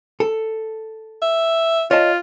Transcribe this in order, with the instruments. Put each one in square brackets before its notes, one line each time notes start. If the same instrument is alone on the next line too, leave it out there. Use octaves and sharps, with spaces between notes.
[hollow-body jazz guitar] A4
[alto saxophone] E5
[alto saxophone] F4 [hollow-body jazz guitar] C#5 D#5 A5